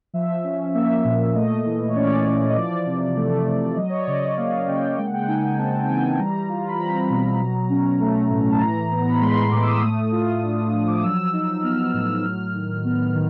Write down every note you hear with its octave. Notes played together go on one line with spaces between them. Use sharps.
F3 E5
C#4
A#3 E5
A#2
A3 D#5
E3
C#5
C#4 D5
E3
D#5
F3 D5
C3
A3
C3
F#3 D#5
C#5
D5
C#3 D#5
A#3 F5
C#3 G5
G#3 G5
F#5
G5
D#4 G#5
C4 A5
G5
E3 G#5
A5
G3 A#5
F4
B5
C4 A#5
B2
F#3
C#4
A3
A2
A5
E3 A#5
B3
A#5
B5
G#3 C6
A2 D6
E6
D#6
A3
F4
D4
F3
D6
D#6
F#3 E6
D#4
B3 F6
A2 E6
F#3 F6
D#3
B3 F6
D#3